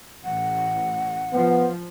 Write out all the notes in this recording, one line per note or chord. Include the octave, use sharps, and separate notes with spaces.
A1 F#5
F3 B3